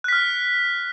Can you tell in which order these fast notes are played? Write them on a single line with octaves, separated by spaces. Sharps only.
F#6 B6 F6